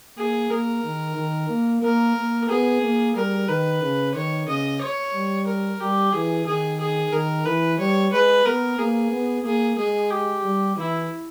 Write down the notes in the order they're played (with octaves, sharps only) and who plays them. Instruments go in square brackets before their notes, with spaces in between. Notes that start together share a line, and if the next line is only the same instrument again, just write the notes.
[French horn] A#3 [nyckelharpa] G#4
[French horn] A#3 [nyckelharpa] A#4
[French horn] D#3
D#3
A#3
[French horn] A#3 [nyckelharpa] A#4
[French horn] A#3
[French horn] B3 [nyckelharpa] G#4
[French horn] A#3
[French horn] G3 [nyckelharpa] A#4
[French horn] D#3 [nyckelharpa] B4
[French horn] C#3
[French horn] D#3 [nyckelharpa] C#5
[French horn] C#3 [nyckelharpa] D#5
[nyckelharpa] C#5
[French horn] G3
[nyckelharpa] A#4
[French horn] G3 [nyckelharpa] G4
[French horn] E3 [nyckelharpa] G#4
[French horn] D#3 [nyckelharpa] G#4
[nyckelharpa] G#4
[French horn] D#3 [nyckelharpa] A#4
[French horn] E3 [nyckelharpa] B4
[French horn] G3 [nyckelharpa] C#5
[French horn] G#3 [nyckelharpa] B4
[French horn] B3 [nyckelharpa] A#4
[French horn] A#3 [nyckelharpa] G#4
[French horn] B3
[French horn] A#3 [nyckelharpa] G#4
[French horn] G#3 [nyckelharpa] G#4
[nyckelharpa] G4
[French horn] G3
[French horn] E3 [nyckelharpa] E4